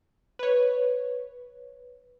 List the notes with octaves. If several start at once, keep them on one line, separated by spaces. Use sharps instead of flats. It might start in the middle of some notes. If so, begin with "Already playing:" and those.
B4 C#5